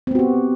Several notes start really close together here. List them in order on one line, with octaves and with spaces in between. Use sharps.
C4 B3 F#4 G4